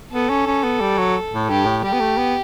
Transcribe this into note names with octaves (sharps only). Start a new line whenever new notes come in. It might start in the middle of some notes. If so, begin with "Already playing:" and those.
B3 A4
C#4
C#4
B3
G3
F#3
A2
G2 G4
A2
G3 G4
B3
A3
B3